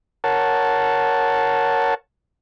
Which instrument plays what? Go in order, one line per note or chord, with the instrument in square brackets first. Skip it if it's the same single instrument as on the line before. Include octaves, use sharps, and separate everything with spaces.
[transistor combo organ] A#4 C#5 F#5 A5